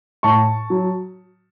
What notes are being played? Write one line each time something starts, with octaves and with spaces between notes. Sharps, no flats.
A2 A5 C#6
F#3